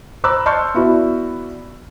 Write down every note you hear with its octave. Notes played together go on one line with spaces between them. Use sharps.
C5 A#5 B5 D6 E6 F#6
A5 C6 C#6 F6 G6 C#7
B3 E4 F#4 B4 D5